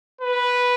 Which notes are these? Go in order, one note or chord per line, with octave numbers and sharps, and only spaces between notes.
B4